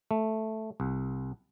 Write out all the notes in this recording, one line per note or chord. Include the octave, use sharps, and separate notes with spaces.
A3
C2